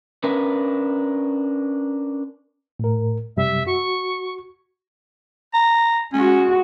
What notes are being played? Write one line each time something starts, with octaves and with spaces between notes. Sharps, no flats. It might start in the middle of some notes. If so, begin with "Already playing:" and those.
C#4 D4 A#4 B4
A2 A#4
F#2 C3 G3 E5
F#4 C#6
A#5
G#3 C#4 F#4